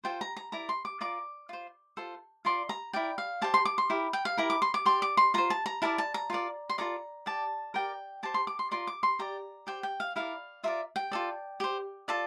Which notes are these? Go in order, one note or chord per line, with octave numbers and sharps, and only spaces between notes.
F4 A4 C5 G5
A#5
A#5
E4 A#4 D5 A#5
C6
D6
F4 A#4 D5 D6
F4 C5
F4 A4 C5
F4 A#4 D5 C6
A#5
E4 A#4 D5 G5
F5
G4 C5 A5
C6
D6
C6
E4 G4 A#4
G5
F5
E4 G4 A#4 A#5
D6
C6
D6
G4 D5 C6
D6
C6
F4 C5 A#5
A5
A#5
E4 A#4 D5 A5
A5
A#5
F4 A#4 D5
C6
F4 A4 D5 A#5
G4 D5 A5
G4 A#4 D5 G5
G4 C5 A5
C6
D6
C6
F4 A#4 D5 C6
D6
C6
G4 D5 A#5
G4 C5 G5
G5
F5
E4 A#4 D5 F5
F4 A#4 D5 E5
G5
F4 A4 D5
G4 C5
F4 A4 D5 A5